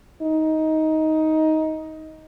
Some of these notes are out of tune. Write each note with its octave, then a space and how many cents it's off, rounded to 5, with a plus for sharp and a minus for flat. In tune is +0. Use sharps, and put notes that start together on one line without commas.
D#4 +15